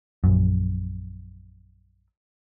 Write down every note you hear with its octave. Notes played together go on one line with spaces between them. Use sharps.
A#1 F#2